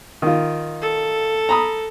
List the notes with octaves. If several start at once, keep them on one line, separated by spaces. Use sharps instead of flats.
D#3 F4
A4
A#5 B5 D#6